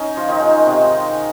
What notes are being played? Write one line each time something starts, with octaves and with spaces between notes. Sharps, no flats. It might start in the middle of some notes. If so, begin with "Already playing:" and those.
Already playing: C#4 D#4
F3 F4
D#3 D#4
G#3
C3